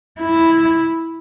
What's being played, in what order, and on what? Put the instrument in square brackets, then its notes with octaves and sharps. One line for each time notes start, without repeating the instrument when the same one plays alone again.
[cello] E4